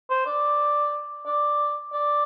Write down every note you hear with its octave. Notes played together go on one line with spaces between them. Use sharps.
C5
D5
D5
D5